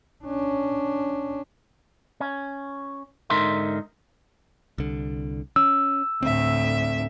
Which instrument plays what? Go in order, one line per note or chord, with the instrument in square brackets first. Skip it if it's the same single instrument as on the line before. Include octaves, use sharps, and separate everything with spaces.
[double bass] C#4 D4
[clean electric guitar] C#4
G#2 D3 D#4 A#4 E5 C6
[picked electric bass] C2 D3
[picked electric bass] C#4 [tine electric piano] E6
[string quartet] D2 A2 E5 [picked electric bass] C4